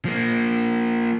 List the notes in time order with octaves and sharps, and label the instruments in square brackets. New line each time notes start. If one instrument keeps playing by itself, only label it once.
[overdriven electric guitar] F3 A#3